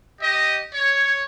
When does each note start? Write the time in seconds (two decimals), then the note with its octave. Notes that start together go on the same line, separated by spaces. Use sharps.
0.19 G4 D#5
0.73 C#5